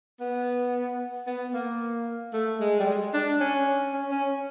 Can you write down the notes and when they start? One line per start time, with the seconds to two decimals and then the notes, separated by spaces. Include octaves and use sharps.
0.20 B3
1.27 B3
1.54 A#3
2.33 A3
2.60 G#3
2.80 G3
2.87 G#3
3.13 D4
3.41 C#4
3.93 C#4
4.11 C#4